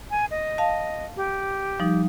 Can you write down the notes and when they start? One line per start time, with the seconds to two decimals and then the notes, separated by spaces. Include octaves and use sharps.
0.11 G#5
0.31 D#5
0.58 F5 A5
1.16 G4
1.80 F3 G3 D#4